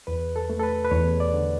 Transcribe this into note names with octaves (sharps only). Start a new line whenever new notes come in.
E2 B4
A4
A3
A4
B4
B4
E2 C#5
D5
D3